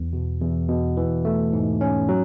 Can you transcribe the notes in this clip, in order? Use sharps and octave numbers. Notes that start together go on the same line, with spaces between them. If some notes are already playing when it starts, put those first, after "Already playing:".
Already playing: E2
B2
E2
B2
E3
A3
G#2
C#4
F#3